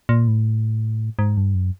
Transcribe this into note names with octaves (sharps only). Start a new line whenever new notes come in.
A#2
A2
G#2
G2
F#2